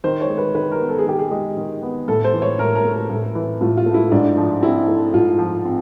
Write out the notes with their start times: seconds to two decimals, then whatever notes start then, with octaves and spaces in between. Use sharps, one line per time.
0.04 D#3 C5
0.21 C#5
0.29 G#3
0.38 B4
0.55 D#3 B4
0.71 A#4
0.80 B3
0.89 A4
0.98 G#4
1.06 D#3 G4
1.18 G#4
1.31 G#3
1.57 D#3
1.82 B3
2.08 A2 A4
2.24 C5
2.33 E3
2.42 C#5
2.59 A2 A#4
2.75 A#4
2.84 A3
2.92 A#4
3.10 A2 A4
3.35 E3
3.61 A2 F4
3.77 F4
3.86 A3
3.94 E4
4.12 G#2 D4
4.37 F3
4.62 C4 E4
4.88 A3
5.14 G#2 F4
5.39 F3
5.65 C4